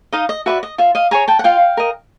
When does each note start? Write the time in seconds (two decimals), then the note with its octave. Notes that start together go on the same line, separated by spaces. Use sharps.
0.13 D#4 D#5 F5
0.29 D#5
0.46 F#4 B4 D5 E5
0.63 D#5
0.78 F4 E5
0.95 D#5 F5
1.11 G#4 C#5 G#5 A#5
1.28 G5 A5
1.39 F#5
1.44 F4 F5 G5
1.77 A#4 D#5